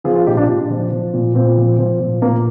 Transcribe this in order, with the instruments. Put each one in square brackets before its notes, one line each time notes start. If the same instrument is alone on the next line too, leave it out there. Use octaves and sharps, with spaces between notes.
[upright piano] F3 F4 G#4
F4 G#4
A#2 D#4 G4
D4 F4
A#2
F3
F3
A#2
A#2 C4
F3
F3
A#2
A#2 A#3